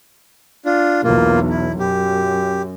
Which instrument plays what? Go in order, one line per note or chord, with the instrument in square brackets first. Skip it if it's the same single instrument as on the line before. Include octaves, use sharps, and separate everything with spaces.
[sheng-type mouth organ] D4 F4
[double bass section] B1 E2 [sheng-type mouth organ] A#3 F4
[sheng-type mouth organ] E4
[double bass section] F#2 [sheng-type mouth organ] G4